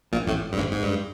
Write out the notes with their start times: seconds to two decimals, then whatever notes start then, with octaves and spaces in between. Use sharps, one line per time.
0.12 A#1 A#2
0.27 A1 A2
0.53 G2
0.57 G#1 G#2
0.72 G#2
0.83 G2